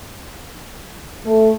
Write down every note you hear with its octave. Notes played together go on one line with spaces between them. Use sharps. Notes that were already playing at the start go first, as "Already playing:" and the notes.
A3